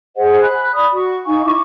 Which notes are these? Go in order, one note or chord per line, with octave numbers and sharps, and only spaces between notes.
G#4 C5 D#5 F#5
B5 F#6
D5 B5 D#6
F#4 C#6
D#4 F5 G#5 C#6
E4 C#6 D6